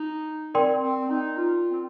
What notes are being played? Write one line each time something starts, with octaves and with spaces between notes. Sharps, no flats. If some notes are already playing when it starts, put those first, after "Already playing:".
Already playing: D#4
C4 A#4 D5 G5 C6
C4
D#4
F4
C4